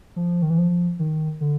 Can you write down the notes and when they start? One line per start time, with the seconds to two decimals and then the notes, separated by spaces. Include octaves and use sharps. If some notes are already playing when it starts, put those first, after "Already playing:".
0.16 F3
0.42 D#3
0.50 E3
0.58 F3
0.99 D#3
1.41 D3